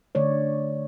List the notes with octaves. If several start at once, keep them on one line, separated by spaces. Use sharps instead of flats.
D3 A3 C#5 D5